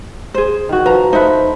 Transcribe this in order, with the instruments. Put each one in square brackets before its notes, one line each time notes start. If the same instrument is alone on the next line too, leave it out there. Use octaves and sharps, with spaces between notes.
[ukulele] G#4 C5
[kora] D#3 F#4
[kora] F3 [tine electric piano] B4 [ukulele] A#5
[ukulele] D#4 E5 [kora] F4 A4 B4 [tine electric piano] C5